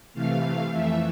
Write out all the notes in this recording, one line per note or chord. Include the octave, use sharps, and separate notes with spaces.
C3 E3 A3 F5
F2 E3 A3 E5